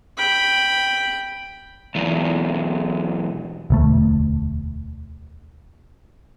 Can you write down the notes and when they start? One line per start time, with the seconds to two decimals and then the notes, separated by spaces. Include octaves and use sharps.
0.18 G5 B5
1.95 B1 E2
3.70 E1 D2 A3